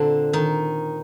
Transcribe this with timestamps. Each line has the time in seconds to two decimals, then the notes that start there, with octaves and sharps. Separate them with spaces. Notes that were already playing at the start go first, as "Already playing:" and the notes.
Already playing: A#2 D3 C4 D4
0.33 D#3 D#4